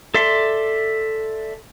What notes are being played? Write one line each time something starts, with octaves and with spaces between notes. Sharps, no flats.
A4 D5 E5 C6